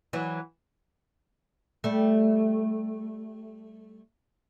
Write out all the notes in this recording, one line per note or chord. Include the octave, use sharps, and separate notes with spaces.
E3 F#3
G3 A3